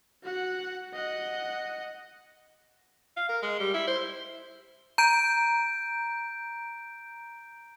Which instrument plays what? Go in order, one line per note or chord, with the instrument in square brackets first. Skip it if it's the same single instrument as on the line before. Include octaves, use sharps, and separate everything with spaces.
[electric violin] F#4 F#5
D#5 F#5
[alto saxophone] F5
A#4
G#3
G3
E4
C5
[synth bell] A#5 G6 D7